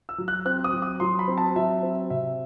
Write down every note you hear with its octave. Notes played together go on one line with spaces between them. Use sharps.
E6
F#3
F#6
C4 F#6
D#6
F#3
D#6
F#3 C6
B5
C4
A5
F#3 E5
C4
C3 E5